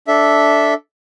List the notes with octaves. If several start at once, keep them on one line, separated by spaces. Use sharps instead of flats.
D4 A4 E5